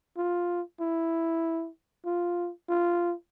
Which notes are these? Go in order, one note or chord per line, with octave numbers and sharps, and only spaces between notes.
F4
E4
F4
F4